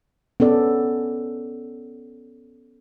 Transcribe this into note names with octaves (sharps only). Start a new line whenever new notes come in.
B3 C#4 A4 D5